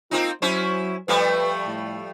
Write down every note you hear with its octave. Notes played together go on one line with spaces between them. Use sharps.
A#3 C4 D#4 F4
F#3 C#4 E4 C5
F3 G3 A3 B4
A2